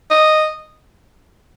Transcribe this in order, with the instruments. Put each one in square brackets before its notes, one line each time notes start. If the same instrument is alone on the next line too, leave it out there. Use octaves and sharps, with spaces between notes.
[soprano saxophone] D#5